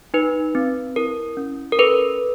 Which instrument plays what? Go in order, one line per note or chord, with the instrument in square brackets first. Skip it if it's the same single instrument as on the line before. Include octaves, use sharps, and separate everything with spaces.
[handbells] D#4 B4
C4
E4 A#4
C#4
A#4
A4 B4